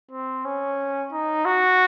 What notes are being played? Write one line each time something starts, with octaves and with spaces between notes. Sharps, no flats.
C4
C#4
D#4
F#4